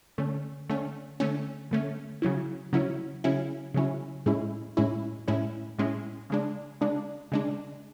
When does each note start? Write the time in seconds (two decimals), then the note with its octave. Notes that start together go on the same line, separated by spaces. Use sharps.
0.18 D3 A3 C#4
0.69 D3 A3 C#4
1.20 D3 A3 C#4
1.71 D3 A3 C#4
2.22 C#3 F#3 C#4 E4
2.73 C#3 F#3 C#4 E4
3.24 C#3 F#3 C#4 E4
3.74 C#3 F#3 C#4 E4
4.26 A2 G#3 C#4 E4
4.77 A2 G#3 C#4 E4
5.28 A2 G#3 C#4 E4
5.78 A2 G#3 C#4 E4
6.30 C#3 G#3 D4
6.81 C#3 G#3 D4
7.32 C#3 G#3 D4